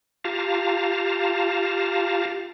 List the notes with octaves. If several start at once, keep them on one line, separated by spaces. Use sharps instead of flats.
F4 G4 F5 A5 A#5